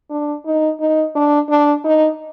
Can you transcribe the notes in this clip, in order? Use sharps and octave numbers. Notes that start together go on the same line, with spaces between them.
D4
D#4
D#4
D4
D4
D#4